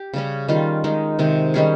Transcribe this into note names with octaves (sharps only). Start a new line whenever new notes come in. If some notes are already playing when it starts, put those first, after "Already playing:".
Already playing: G4
C#3 G3 C#4
D#3 G3 C#4 F4
D#3 G#3 D#4
C3 D#3 G#3
D#3 G3 C#4 G#4